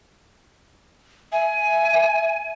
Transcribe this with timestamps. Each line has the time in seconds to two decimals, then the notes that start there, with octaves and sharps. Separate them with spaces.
1.32 E5 G#5